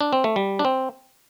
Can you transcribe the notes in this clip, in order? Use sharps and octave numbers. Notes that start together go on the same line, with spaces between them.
D4
C4
A3
G3
D4
C4